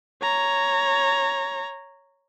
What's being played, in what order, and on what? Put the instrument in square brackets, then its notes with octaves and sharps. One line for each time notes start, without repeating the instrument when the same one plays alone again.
[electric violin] C#5 A#5